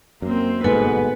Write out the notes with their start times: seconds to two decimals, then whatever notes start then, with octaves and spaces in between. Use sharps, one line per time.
0.22 F#2 A#3 C4
0.64 G1 G#2 B2 B3 A4 B4 G#5